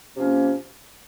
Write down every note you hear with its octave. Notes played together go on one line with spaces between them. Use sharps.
C3 F3 A#3 C#4